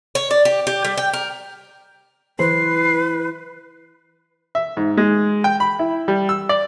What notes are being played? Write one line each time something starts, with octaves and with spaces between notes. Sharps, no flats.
C#5
D5
G4
G4
G3
G5
A#4
E3 B4 C5 C7
E5
G#2
G#3
G5
B5
E4
G3
E6
D5